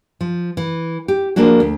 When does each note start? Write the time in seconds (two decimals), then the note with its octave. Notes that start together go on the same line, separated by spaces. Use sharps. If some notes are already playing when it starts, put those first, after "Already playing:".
0.21 F3
0.57 E3
1.08 G4
1.36 F3 A#3 D4 F#4 G#4
1.60 D2